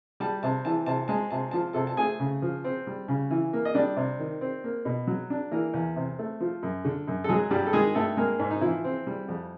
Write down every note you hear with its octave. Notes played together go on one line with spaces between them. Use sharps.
G3 A5
C3 A5
E3 A5
C3 A5
G#3 A5
C3 A5
F3 A5
C3 A4 A5
A5
A3 G#4 G#5
C#3
F3
C4
G3
C#3
E3
A#3
D#5
G3 D4 D5
C3
D#3
C4
A#3
B2
F#3
D4
E3 A#3 A#4
E2
C3
A3
F3
F#2
D3
F#2
A4
F#3 G#3 G#4
G2 G3 G4
A4
D#3 G#3 G#4
G2 A3 A4
G#3 A#3 A#4
G#2
D#4
E3 F3 E4
C4
G3
F2